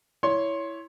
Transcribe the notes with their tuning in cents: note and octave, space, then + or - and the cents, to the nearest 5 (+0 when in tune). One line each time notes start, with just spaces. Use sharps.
E4 +0 C#5 +15 C6 +25